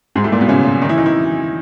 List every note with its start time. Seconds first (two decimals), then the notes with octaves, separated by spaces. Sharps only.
0.15 G#2 G#3
0.24 A2 A3
0.32 A#2 A#3
0.41 B2 B3
0.49 C#3 C#4
0.82 D#3 D#4
0.89 E3 E4
0.98 D#3 D#4
1.06 E3 E4